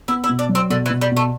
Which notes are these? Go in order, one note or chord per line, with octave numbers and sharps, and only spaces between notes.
B3 E4
E4
B2
D4
F#3
C4
B2 D3
E3
B2
G3
B2 A3